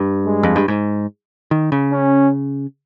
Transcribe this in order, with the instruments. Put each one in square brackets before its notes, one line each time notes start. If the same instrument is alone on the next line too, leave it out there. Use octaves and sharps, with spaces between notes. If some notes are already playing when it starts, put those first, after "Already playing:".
Already playing: [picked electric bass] G2
[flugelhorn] G#3
[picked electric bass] F2
G2
G#2
D#3
C#3
[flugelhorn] C#4